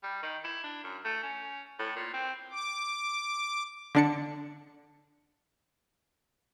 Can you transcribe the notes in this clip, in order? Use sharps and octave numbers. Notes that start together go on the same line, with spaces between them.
G3
D#3
E4
D4
F#2
A3
C#4
A2
A#2
C4
D6
D3 D4 C#7